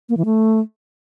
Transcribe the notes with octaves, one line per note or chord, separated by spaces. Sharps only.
A#3
E3
A3